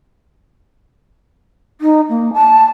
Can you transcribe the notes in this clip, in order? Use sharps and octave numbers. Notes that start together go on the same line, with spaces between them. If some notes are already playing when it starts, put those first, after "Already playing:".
D#4
A#3
A5